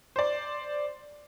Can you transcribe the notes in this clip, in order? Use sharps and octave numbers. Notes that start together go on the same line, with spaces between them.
C5 D5